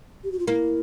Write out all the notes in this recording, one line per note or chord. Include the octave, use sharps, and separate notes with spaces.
G4
F#4
F4
A#3 E4